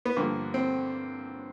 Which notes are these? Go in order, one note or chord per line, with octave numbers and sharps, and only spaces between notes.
B3
G2 D3 F3 A#3
C4